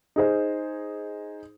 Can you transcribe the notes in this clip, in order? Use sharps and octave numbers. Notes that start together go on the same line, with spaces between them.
D#4 G#4 C5